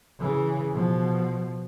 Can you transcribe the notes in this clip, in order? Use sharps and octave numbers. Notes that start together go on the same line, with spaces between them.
C#3 E3
B2 F3